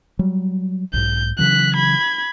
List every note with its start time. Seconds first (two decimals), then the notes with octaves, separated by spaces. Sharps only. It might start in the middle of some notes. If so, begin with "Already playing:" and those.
0.19 F#3 G3
0.93 B1 G#2 G6
1.39 C#3 E3 F#3 F#6 B6
1.75 B5 G#6